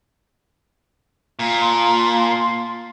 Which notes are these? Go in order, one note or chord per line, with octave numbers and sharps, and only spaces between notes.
A#2
F5 A5 C6